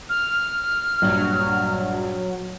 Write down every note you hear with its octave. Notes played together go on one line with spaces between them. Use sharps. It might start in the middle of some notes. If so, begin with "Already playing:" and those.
F6
A#1 G2 F#3